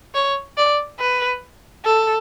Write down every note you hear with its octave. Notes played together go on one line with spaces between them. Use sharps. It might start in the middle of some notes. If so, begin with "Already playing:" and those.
C#5
D5
B4
A4